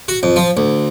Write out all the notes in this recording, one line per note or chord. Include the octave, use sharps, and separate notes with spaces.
F#4
F2
F3
D2